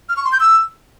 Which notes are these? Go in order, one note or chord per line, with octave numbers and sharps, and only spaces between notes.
F6
C#6
C6
G6
E6